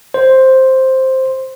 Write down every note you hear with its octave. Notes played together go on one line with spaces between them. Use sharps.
C5